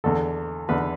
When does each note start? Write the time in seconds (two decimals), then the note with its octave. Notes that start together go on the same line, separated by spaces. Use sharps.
0.04 E2 D3 A4
0.68 E2 D3 B4